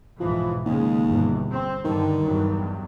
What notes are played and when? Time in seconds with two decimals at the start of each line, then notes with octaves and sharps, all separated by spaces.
0.20 B1 G#2 E3 F3
0.66 D#2 C#3 G#3
1.08 G1 E2 B2
1.52 C4
1.84 G2 D3 D#3
2.25 E2 G2 F#3